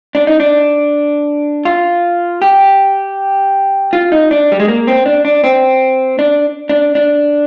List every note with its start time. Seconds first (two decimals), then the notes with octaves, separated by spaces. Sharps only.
0.15 D4
0.27 D#4
0.40 D4
1.65 F4
2.42 G4
3.93 F4
4.12 D#4
4.31 D4
4.52 G3
4.60 G#3
4.68 A#3
4.87 C4
5.06 D4
5.25 D4
5.44 C4
6.19 D4
6.69 D4
6.95 D4